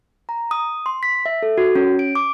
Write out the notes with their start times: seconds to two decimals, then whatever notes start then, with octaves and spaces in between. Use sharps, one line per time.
0.29 A#5
0.51 D#6
0.86 C6
1.03 B6
1.26 E5
1.43 A4
1.58 F#4
1.75 C#4
1.99 D7
2.15 D6